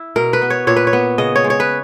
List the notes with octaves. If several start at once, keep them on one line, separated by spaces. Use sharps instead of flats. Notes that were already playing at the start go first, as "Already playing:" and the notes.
Already playing: E4
B2 A#4
B4
B3
C#5
A#2 C#5
B4
C#5
B3
C#3 D#5
C#5
G#3
C#5
B4